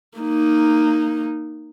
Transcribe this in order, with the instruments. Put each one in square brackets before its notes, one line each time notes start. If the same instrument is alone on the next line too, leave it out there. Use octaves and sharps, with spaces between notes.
[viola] A#3 D#4